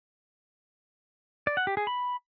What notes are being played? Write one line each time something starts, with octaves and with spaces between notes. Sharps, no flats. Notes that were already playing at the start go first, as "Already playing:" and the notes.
D5
F#5
G4
G#4
B5